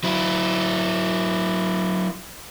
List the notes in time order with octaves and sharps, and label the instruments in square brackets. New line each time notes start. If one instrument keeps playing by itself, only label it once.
[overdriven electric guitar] F#3 E4